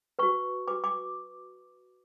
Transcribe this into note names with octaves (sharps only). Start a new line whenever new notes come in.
F#4 B4 C#6
F#4 B4 D6
D6